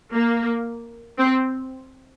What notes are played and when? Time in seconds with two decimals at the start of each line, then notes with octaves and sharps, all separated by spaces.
0.13 A#3
1.18 C4